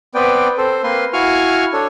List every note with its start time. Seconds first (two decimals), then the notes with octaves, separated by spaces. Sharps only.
0.15 B3 C4 B4 D5 G5
0.58 C4 A4 C5
0.83 A#3 C4 B4 C6
1.13 E4 F#4 F5 G#5 C#6 F6
1.73 D4 A4 C#5